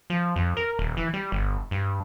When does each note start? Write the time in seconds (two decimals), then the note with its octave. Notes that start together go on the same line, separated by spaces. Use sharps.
0.10 F3
0.36 F2
0.57 A#4
0.79 D#1
0.97 E3
1.14 G3
1.32 G1
1.71 G2